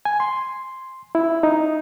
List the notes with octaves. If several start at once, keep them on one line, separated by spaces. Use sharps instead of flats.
G#5
C6
E4
D#4